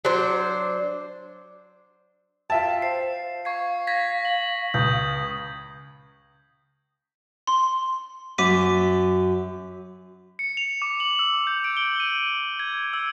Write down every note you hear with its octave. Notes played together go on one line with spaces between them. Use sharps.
F#3 D4 C5
F4 E5 G5 A5
C5 C7
F5 C#6 G#6 C7
G#6 A#6 B6
F#7
C#2 D#6 G6
C6
F#2 D6 B6 D#7
C#7
F7
D6
F#7
E6
G6
D7
G7
D#7
D#7
G#6
E6